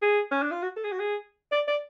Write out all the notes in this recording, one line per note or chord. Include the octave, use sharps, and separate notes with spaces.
G#4
C#4
D4
F4
F#4
A4
G#4
F#4
G#4
D5
D5